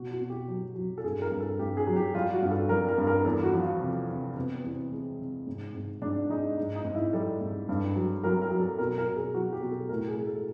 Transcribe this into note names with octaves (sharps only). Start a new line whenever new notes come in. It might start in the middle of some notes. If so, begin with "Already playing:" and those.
Already playing: B2 F#4
F#4
B2
G4
F#3
F#3
A4
G2 G#4
A#4
G2
A4
G2 G4
G#4
F#3
G4
G3 F4
F#4
G2
A4
G3 A#4
A#4
G2
A#4
E2 A4
F#4
F3
F4
C3
C3
C3 B3
B3
E2
C4
G#3
C3
G#2
G#2
G#2 D4
G#3 D#4
G#2
D#4
G#2
E4
G3 A4
G#2
G2
F#3
F#3 A#4
A#4
F#3
A4
B2 A#4
A#4
B2
G#4
F#3 F#4
G4
B2
A4
A2 A#4
G#4
G#3
A4